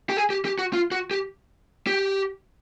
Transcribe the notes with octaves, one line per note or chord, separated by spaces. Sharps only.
G4
G#4
G4
G4
F#4
F4
F#4
G4
G4